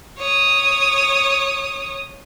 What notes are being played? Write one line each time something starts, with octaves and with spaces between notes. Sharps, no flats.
C#5 D#6